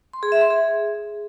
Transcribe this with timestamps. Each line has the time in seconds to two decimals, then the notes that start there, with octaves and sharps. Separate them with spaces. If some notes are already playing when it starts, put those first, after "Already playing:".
0.13 C6
0.23 G#4
0.32 E5
0.41 C6
0.50 G#4